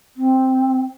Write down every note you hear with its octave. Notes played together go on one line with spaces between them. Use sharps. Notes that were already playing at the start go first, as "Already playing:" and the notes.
C4